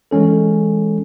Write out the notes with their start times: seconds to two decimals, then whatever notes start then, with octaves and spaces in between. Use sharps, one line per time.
0.11 E3 G#3 C#4 A4